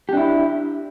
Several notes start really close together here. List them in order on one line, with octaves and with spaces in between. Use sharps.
G4 D4 E4